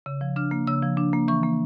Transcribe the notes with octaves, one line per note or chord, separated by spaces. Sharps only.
C#3
F3
D4 F6
A#3
C#3 E6
F3
D4
A#3
E3 C#6
A#3